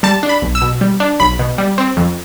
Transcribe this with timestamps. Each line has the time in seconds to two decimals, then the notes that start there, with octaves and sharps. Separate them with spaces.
0.03 G3 A5
0.23 D4
0.29 B5
0.42 B1
0.55 E6
0.62 B2
0.81 G3
1.00 D4
1.20 B1 B5
1.39 B2
1.58 G3
1.78 C4
1.97 F2